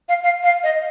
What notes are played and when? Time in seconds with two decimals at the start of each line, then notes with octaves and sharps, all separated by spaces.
0.09 F5
0.23 F5
0.43 F5
0.64 D#5